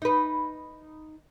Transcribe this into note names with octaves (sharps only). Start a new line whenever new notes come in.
D#4 B4